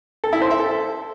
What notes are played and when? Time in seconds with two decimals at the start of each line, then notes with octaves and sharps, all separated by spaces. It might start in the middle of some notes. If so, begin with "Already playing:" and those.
0.24 A4
0.33 E4
0.42 C5
0.51 E5
0.60 A4